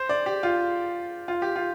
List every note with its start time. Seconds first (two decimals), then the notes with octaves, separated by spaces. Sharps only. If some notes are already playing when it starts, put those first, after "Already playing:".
Already playing: C5
0.09 D5
0.26 G4
0.43 F4
1.28 F4
1.42 G4
1.56 F4